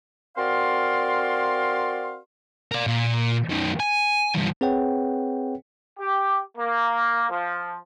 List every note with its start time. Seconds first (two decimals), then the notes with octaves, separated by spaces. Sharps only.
0.37 C4 F#4 A#4 D5 F5 C6
2.72 A#4 D5
2.87 A#2
3.49 F#2 D#3
3.80 G#5
4.35 E2 G2
4.61 C4 G#4 B4 C#5 F#5 G5
5.99 G4
6.58 A#3
7.30 F3